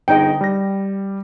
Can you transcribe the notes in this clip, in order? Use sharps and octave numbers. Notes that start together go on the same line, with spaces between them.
G1 D#4 G#4 D#5 G5
G3 A#6